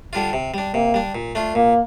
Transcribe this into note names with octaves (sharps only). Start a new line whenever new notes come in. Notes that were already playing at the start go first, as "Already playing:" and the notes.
D3 G3 D4 F4
C3
G3 D4
C3 A#3
G3 D4
A#2
A3 D4 F4
A#2 A#3